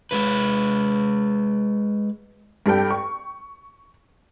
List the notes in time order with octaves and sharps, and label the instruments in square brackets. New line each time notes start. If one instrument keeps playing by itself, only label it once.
[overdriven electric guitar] G#3 B4
[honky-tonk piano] G2 G3 A4 G5
C#6